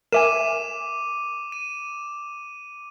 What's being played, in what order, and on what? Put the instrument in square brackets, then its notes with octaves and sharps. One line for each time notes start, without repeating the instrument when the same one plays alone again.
[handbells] A#4 E5 G#5 [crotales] D6 D#7 E7
[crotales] D#7